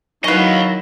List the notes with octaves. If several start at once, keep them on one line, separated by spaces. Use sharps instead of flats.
D#3 F#3 C#4 E4 B4 D#5 F5